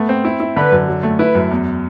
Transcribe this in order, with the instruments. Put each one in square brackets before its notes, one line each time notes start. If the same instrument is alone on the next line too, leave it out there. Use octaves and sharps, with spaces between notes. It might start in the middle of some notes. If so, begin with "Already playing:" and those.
Already playing: [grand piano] A3 B3
C4
E4
E4
[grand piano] D3 [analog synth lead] B4
[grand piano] F#2
F#3
A3
[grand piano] E4 [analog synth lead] B4
[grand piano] F#2
E2